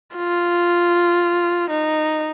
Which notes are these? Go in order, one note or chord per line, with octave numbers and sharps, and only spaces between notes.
F4
D#4